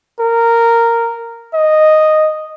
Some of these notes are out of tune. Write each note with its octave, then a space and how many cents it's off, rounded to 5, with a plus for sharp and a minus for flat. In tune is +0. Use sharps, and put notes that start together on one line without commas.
A#4 -10
D#5 -5